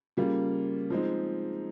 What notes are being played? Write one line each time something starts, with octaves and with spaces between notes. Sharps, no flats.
C#3 G3 A#3 F4
F3 G#3 C4 D#4